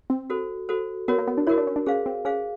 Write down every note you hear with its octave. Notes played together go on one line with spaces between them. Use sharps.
C4
F#4 A4 C5
F#4 A4 C5
B3 F#4 A#4 C#5
A#3
B3
D4
E4 F#4 A#4 C#5
D4
C#4
D4
C#4 G#4 C5 F5
C4
C#4 G#4 C5 F5